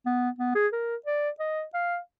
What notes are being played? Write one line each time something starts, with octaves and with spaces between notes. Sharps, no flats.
B3
B3
G#4
A#4
D5
D#5
F5